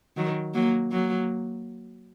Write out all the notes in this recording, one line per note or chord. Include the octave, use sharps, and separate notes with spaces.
D#3 F#3
F#3 A#3
F#3 A#3